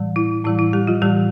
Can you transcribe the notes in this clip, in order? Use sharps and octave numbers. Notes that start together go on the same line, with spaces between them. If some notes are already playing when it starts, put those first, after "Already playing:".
Already playing: A2 E3 G3
E4
A2 E3 G3 E4
E4
G3 G4
F3 F4
A2 E3 G3 G4